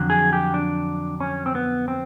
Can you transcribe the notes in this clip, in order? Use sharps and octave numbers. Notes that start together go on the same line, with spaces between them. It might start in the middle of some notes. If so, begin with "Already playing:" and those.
Already playing: F2 D3 F#3
G#4
G4
D4
C#4
C4
B3
C4